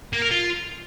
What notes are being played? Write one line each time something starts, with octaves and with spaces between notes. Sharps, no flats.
A#3
A#4
F4